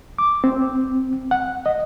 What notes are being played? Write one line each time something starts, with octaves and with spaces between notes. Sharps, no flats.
D6
C4
F#5
D#5